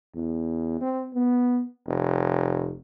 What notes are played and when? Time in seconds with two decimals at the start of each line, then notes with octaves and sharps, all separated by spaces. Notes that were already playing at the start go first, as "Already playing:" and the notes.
0.15 E2
0.81 C4
1.14 B3
1.87 F1